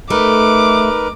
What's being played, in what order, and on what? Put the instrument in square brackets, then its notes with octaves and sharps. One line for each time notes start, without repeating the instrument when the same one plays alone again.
[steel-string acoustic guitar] A3 [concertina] D#4 A#4 B4 [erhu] D6